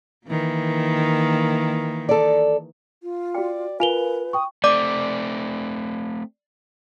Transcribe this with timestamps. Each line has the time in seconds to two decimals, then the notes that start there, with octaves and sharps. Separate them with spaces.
0.26 D#3 E3 A#3
2.09 A4 D5
3.03 F4
3.35 F#4 D5 G5
3.80 F4 A#4 B4 F5 G#5 F7 G7
4.33 G5 C#6 D#6
4.64 A3 C4 D5 D6